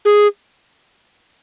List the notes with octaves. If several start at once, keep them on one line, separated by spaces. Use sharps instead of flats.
G#4